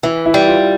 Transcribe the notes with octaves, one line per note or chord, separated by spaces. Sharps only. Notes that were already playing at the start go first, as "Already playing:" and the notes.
E3 E4
E4
G3
F4